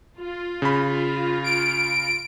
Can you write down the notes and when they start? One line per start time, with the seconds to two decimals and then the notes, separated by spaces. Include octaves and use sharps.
0.19 F4
0.62 C#3 B5
1.44 D7